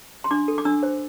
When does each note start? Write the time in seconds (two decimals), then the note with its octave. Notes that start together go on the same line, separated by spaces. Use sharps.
0.24 C6
0.31 D4 D6
0.48 A4
0.58 D6
0.65 D4 E6
0.83 C5